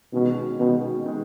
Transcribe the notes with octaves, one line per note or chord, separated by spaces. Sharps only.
B2 D#3 G#3 C#4
B2 D#3 G#3 C#4
D#3 G#3